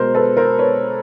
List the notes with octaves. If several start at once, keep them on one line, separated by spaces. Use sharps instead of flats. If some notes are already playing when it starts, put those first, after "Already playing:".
Already playing: B2 G#3 A#4 C5
A4 B4
A#4 C5
B4 C#5